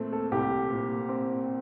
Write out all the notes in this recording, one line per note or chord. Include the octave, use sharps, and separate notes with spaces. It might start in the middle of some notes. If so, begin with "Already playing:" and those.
Already playing: A#2 A3 C4
A4
C2 G4
A#2
C4